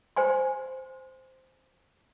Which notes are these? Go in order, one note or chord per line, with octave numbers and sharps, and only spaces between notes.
C5 G5 G#5 C6